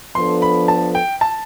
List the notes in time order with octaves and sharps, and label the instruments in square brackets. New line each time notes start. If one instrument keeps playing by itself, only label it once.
[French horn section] F3 B3 D4 A4 [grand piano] C6
[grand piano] B5
A5
G5
A5